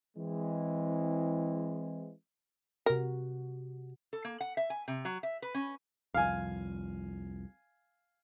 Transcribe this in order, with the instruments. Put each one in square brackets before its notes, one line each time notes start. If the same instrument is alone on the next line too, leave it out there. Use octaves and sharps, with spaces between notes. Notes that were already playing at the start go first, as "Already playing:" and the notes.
[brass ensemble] E3 G#3 C4
[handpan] C3 F#4 [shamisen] A#4
[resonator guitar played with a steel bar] A4
A#3
F#5
E5
G#5
C3
F#3
E5
B4
C#4
[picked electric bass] C2 F2 [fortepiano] F5 G#5